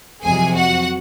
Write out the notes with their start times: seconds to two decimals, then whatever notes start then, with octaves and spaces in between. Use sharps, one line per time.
0.25 F2 C3 F#3 G#4 G#5
0.56 F#4 F#5